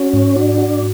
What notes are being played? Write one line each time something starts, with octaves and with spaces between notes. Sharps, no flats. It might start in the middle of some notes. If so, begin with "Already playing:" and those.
Already playing: C#4 F#4
G#2
D4 F#4
F#4